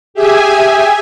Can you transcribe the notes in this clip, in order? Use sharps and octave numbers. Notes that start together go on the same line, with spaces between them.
G4 G#4 E5 G#5